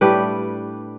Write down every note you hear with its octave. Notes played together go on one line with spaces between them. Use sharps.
A2 G3 D4 G4 B4